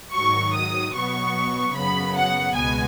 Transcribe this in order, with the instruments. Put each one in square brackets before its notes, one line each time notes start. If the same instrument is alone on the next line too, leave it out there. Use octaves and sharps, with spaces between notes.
[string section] G#2 D#3 F#3 C#6
D#6
B2 F#3 B3 C#6
F#2 C#3 F#3 B3 B5
F#5
C#2 B2 G#3 B3 G#5